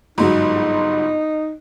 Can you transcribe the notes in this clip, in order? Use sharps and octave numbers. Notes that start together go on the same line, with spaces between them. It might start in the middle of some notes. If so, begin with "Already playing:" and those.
G1 G#2 F#3 D#4